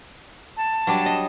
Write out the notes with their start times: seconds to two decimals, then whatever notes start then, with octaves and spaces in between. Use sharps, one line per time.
0.57 A5
0.87 F#3 G3 D4
1.06 D#5